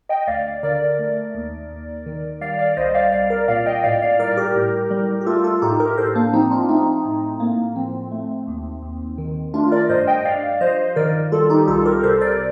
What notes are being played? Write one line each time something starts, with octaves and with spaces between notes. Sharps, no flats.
D#5 G5
D2 D5 F5
D3 A#4 D5
A3
D#2
D#2
D#3
G3 D5 F5
D5 F5
C2 C5 D#5
D5 F5
C2 D5 F5
A#4 D5
A#2 D5 F5
D#5 G5
A2 D5 F5
D5 F5
G3 A#4 D5
G4 A#4
A2
G3
G4
A3 F4 A4
F4 A4
A2 D#4 G4
G4 A#4
A2 A4 C5
A#3 D4
F3 C4 D#4
D4 F4
A3 C4 D#4
A2
A2 A#3
F3 C4
A3
D#2
D#2
D#3
A3 D4 F4
A#4 D5
G2 C5 D#5
D#5 G5
G2 D5 F5
F3 C5 D#5
D#3 A#4 D5
G3 F4 A4
D#4 G4
C2 F4 A4
G4 A#4
C3 A4 C5
A#4 D5